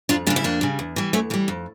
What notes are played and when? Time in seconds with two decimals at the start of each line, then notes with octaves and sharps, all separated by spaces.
0.09 F2 D4 F4
0.27 C#3 D4 F4
0.30 G3
0.36 E4
0.44 F2 A#3 D4
0.61 C#3 G3
0.79 E2
0.96 E3 G3
1.13 E2 A3 C#4
1.30 E3 A#3
1.34 G3
1.48 F2